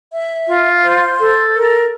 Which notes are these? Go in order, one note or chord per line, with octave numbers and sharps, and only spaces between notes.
E5
F4
C5
A4
A#4